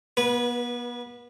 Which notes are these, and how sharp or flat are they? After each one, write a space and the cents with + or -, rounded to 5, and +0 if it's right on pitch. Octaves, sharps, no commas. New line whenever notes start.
B3 -35 B4 -10